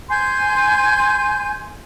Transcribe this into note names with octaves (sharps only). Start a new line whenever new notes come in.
G#5 C6 G6